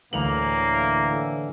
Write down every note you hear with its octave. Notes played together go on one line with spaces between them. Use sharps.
D2 A2 D3 E3 A#3 F7 F#7